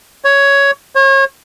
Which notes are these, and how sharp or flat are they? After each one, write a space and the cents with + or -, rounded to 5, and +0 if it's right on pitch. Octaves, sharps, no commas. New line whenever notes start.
C#5 +10
C#5 -35